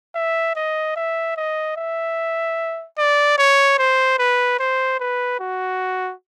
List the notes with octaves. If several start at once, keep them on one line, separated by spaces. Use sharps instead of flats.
E5
D#5
E5
D#5
E5
D5
C#5
C5
B4
C5
B4
F#4